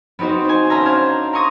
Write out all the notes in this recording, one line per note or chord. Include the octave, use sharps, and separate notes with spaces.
B3 C4 D#4 F#4 C5
C5 G#5
C#4 A#4 C5 E5 A5 A#5
D4 F5 G#6
A#5 C6 C#6 D#6 A#6